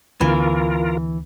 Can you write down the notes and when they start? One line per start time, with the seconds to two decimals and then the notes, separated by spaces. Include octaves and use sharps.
0.21 D2 D3 E3 B3 F4 A#4